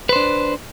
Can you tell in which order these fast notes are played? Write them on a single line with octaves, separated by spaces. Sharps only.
B4 C5 D4